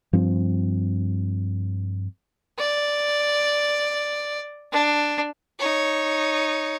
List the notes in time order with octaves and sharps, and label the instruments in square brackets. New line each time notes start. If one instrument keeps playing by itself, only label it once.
[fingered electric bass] G2 F3 C4
[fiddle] D5
D4
D#4 C#5